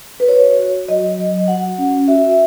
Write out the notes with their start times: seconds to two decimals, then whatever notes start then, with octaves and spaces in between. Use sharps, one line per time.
0.20 B4
0.28 F#4 C#5
0.59 F#4
0.88 F#3 D#5
1.18 F#3
1.48 F#4 F#5
1.78 C#4
2.08 F#4 E5